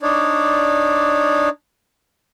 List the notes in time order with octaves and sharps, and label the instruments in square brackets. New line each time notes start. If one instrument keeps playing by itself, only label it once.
[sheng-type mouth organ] D4 D#4 C#5 D5